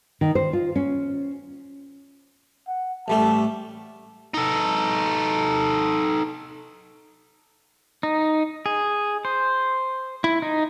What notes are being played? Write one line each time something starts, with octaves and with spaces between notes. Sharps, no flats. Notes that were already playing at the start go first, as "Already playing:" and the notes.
D#3
C5
F4
C#4
F#5
A1 G3 A3 A5
D#4 A4
D#4
G#4
C5
E4
D#4